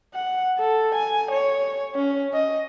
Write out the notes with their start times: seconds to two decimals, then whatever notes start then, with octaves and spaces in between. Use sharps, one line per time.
0.14 F#5
0.58 A4
0.95 G#5
1.31 C#5
1.95 C#4
2.34 D#5